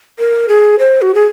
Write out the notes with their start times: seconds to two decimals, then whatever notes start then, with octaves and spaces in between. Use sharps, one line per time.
0.19 A#4
0.49 G#4
0.79 C5
1.02 F#4
1.14 G#4